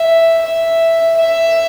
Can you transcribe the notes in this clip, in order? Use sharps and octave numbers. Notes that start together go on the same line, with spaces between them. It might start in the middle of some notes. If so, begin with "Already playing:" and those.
Already playing: E5
E5
E5